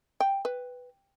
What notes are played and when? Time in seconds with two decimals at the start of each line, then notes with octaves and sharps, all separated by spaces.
0.20 G5
0.45 B4